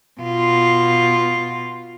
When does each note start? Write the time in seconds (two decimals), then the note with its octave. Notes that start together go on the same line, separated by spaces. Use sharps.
0.21 B2 F4